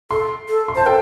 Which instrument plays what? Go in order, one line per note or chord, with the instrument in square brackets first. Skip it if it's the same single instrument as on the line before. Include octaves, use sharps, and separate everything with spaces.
[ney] A4 [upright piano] C6
[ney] A4
[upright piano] C6
[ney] C5 [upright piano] A5
[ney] A4 [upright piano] G5